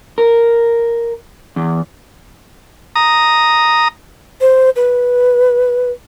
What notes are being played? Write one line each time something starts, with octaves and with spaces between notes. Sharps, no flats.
A#4
E2
A#5 D#6
C5
B4